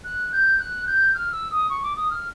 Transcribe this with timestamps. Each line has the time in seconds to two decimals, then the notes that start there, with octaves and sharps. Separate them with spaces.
0.04 F#6
0.32 G6
0.59 F#6
0.87 G6
1.15 F6
1.32 E6
1.51 D#6
1.69 C#6
1.83 D6
1.96 D#6
2.11 F6